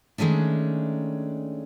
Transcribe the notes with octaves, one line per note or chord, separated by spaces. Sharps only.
D#3 G#3 A3 C#4 D4